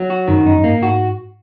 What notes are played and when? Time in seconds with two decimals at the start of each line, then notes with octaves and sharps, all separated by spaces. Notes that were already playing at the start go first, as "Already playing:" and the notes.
Already playing: F#3
0.10 F#4
0.28 F#2 D#3
0.46 F#2 D#4
0.56 F#2
0.63 G#2 A#3
0.82 G#2 F#4